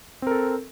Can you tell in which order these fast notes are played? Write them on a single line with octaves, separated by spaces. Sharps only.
C4 A#4 A4